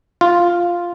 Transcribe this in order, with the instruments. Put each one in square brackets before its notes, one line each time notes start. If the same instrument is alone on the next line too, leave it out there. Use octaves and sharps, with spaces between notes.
[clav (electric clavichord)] F4